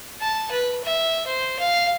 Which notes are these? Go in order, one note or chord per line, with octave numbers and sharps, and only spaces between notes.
A5
B4
E5
C5
F5